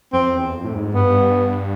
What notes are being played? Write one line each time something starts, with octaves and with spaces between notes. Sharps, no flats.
F2 C4
E2
F2
A2
G#2
G2 B3